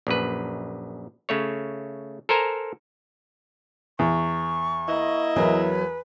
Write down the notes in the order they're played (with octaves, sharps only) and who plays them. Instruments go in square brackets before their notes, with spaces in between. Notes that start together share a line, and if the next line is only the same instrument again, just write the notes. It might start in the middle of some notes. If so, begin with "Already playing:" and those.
[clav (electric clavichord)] A#1 F#2 B4
C#3 A3 C#5
A4 A#4 C5 G#5 A#5
[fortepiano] E2 [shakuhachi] C#6
[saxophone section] A#3 E4 D#5
[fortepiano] E2 [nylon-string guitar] F#3 A#4 [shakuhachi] B4